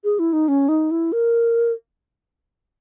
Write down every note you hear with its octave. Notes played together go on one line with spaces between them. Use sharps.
G#4
E4
D#4
C#4
D#4
E4
A#4